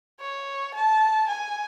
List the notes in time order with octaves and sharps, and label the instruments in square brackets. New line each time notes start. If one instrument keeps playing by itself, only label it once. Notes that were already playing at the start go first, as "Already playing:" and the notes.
[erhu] C#5
A5
G#5